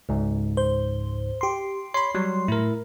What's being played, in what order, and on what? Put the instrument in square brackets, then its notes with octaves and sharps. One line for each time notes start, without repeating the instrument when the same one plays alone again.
[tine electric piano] C#2 G#2
[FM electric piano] C5
G4 C6
[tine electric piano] C#5 B5 [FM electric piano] C6
[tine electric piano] F#3 G3
[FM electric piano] A2 [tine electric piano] E4 A#4